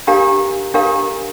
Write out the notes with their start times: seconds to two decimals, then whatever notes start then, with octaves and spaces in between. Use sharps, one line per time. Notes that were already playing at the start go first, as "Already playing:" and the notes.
0.07 D4 G4 A#4 F5 A#5
0.74 D4 G4 A#4 F5 A#5